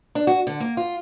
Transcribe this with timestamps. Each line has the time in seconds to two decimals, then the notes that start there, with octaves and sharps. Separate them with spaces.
0.15 D4
0.27 F#4
0.47 D3
0.60 A#3
0.77 F4